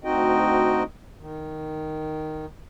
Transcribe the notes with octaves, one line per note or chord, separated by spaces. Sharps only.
D2 C4 D#4 F#4 D#5 G5
D#3